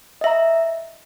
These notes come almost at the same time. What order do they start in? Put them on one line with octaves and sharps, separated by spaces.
D#5 E5 A#5